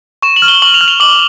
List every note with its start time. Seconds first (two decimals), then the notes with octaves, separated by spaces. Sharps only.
0.22 C#6 E7
0.36 F#7
0.42 F6
0.48 G7
0.62 C#6 F#7
0.74 F7
0.81 F6
0.88 F7
1.00 D6 F#7